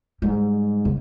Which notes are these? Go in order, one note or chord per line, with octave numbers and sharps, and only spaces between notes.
G#2 G3
C#3